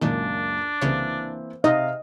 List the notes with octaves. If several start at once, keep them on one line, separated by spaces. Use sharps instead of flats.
C#2 F#2 A#2 D#3 A#3 D4
C2 C#3 E3 A#3 C4 C#5
C3 D#4 D#5 F5